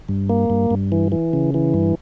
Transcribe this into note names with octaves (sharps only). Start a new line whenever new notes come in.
G2
A#3
G2
G2
E3
E3
C#3
E3
G2